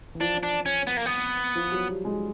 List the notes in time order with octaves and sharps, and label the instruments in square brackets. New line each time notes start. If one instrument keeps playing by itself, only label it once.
[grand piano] E3
[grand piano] F3 [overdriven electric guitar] D4
[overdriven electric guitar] D4
C#4
B3
A#3
B3
[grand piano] F3
F#3
G3
G#3